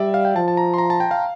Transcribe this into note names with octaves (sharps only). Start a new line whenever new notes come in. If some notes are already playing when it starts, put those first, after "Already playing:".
Already playing: G3 D5 E5
F5
G5
F3 A5
A5
A#5
C6
A#5
A5
G5
F5